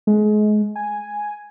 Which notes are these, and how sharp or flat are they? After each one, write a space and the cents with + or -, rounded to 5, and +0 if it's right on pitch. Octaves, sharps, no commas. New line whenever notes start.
G#3 +30
G#5 +0